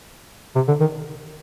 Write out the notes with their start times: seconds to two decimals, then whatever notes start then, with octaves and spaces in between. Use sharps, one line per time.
0.56 C3
0.68 D3
0.81 D#3